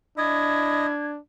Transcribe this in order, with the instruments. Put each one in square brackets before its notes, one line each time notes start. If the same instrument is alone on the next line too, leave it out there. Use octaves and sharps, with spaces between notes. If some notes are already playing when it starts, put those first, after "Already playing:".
[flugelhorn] D4 [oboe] E4 [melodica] D#5 [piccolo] G#6